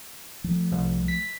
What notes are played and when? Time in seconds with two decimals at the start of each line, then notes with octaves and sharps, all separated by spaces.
0.44 F3 A3
0.72 C2
1.08 B6